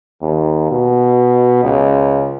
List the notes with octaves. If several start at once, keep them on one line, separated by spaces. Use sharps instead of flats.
D#2
B2
C#2